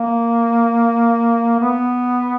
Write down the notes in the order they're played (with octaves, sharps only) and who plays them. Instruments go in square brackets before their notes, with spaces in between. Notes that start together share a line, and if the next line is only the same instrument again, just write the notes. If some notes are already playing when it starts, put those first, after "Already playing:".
Already playing: [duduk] A#3
B3